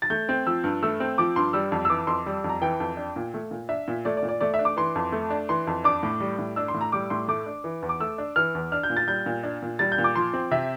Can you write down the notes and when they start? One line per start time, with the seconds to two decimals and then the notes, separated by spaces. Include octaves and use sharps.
0.02 A6
0.10 A3 G6
0.29 C4
0.46 F3 E6
0.64 G2
0.82 A3 E6
1.00 C4
1.18 F3 D6
1.36 G2 C6
1.53 G3 E6
1.72 F2
1.85 E6
1.90 E3 D6
2.07 F2 C6
2.26 G3
2.44 F2
2.49 A#5
2.62 E3 G5
2.80 F2
2.97 D4
3.16 A#2
3.34 A3
3.51 A#2
3.69 D4 E5
3.88 A#2
4.05 A3 D5
4.17 D5
4.23 A#2
4.29 D5
4.41 A3 D5
4.54 E5
4.59 D4
4.65 D6
4.77 E3 C6
4.96 F2
5.12 A3
5.30 D4
5.49 E3 C6
5.67 F2
5.84 D4 D6
6.03 A2
6.20 G3
6.39 A2
6.56 D4 E6
6.68 C6
6.74 A2
6.81 A#5
6.92 G3 D6
7.10 A2 C6
7.28 A3 D6
7.46 D4
7.64 E3
7.82 E2
7.89 D6
8.00 A3 E6
8.18 D4
8.36 E3 F6
8.55 E2
8.72 D4 F6
8.83 G6
8.90 A#2
8.97 A6
9.07 G3 G6
9.26 A#2
9.43 D4
9.62 A#2
9.79 G3 A6
9.92 G6
9.98 A#2
10.04 D6
10.15 F3 C6
10.33 C4
10.51 C3 E5